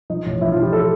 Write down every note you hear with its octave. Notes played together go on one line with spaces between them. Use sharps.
F3 D#4
A1
F3 E4
F4
F3
G4
A4